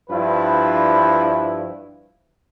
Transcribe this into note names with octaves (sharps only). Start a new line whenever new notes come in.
G2 F3 E4 B4